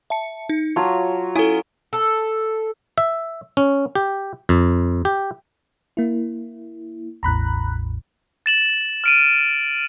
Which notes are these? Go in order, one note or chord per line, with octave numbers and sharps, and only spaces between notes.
E5 A5 C#7
D#4
F#3 F4 C#5 A5
C#4 E4 A4 G#5 D#6
A4
E5
C#4
G4
F2
G4
A#3 E4
A1 E2 A2 A#5 B5 F#6
A6 E7 F#7
F6 D7 D#7